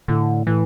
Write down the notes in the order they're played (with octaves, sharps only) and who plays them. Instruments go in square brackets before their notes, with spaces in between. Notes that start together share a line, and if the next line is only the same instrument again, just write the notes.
[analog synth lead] A2 [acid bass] D3
[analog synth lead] A2 [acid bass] E3